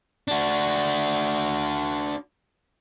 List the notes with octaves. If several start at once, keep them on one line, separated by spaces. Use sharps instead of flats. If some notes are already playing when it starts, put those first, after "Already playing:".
D4 F#4